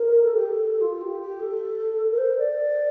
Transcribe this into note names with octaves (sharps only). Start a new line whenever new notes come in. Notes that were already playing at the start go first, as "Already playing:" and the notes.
Already playing: A#4
A4
G4
A4
F4
G4
G4
A4
A#4
C5
D5